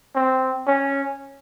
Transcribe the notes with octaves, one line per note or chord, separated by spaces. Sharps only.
C4
C#4